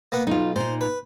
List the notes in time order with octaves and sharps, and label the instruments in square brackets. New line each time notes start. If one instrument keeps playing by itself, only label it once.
[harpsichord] A#3 B3 F#5
[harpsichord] B1 [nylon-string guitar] D#4 F4
[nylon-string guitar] A#2 D#4 [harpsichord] C5
[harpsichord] B4